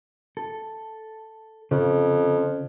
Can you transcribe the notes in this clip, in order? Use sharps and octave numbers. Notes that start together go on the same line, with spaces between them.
A4
F2 C#3